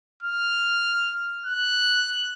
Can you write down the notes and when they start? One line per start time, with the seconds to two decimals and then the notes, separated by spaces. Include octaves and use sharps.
0.23 F6
1.46 F#6